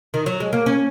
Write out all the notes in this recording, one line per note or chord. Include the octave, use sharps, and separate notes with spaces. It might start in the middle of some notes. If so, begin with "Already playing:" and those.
D#3
F#3
G#3
A#3
C#4